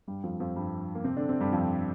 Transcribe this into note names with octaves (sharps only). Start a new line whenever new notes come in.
G2 G3
F2 F3
F2 F3
G2 G3
A#3
C3 C4
D3 D4
C3 C4
G2 G3
F2 F3